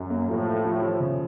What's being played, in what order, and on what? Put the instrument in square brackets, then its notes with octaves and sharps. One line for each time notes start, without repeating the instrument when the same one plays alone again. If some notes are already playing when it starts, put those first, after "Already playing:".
Already playing: [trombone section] F#2
[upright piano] A#3
[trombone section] A2 [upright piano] F3
[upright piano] F4
F3
F3
C#3